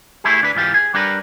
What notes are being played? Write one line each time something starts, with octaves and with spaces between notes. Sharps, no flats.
A3 E4 G4 G#4
D2 D4 B4
G#2 E3 F4 G4
G#4
G3 D4 G4 A#4 B4